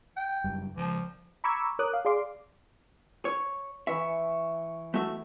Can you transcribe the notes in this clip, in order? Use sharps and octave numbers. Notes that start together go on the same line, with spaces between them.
G5
F#1 F#2 G3
C#2 F3
A#5 B5 C#6 D6 E6 G#6
A#4 C#5 D6 D#6 F#6
F5
G#4 D5 F5 C6 D6
C#5
E3 E5 C#6
A3 F#4 E5